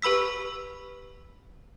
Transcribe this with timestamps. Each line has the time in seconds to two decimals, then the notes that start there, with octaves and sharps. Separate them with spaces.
0.02 G4 B4 B5 E6 B6